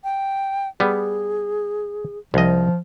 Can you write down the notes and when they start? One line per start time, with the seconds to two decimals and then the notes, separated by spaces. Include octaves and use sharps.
0.04 G5
0.80 G3 B3 G#4
2.34 C2 F3 D#5